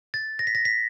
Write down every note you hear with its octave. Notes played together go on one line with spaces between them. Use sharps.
A6
A#6
B6
A#6
B6